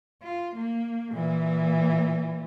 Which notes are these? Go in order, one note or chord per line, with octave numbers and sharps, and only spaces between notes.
F4
A#3
A#2 E3